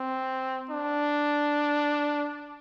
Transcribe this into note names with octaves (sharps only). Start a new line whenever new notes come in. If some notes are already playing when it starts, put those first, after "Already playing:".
Already playing: C4
D4